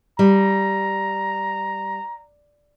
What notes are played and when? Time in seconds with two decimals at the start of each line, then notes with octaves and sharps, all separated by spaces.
0.19 G3 A#5